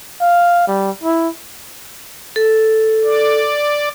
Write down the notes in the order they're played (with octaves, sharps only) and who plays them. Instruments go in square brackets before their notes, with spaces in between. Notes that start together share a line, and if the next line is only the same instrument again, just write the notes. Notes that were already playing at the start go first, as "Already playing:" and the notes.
[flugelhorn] F5
G3
E4
[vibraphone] A4
[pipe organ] D5